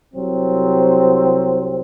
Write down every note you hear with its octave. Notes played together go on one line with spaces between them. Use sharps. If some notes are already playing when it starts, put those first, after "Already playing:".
C2 C3 F#3 C4